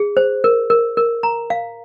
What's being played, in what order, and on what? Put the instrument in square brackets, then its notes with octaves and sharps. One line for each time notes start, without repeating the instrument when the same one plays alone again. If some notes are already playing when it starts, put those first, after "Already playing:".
Already playing: [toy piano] G#4
C5
A#4
A#4
A#4
A#5
F5